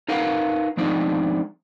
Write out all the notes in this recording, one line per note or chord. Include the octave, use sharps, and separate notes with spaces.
D#4 A#4 B4 F5 F#5
F3 G#3 C4 D4 D#4